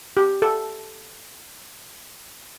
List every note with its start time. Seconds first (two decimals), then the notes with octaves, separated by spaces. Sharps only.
0.17 G4
0.42 A4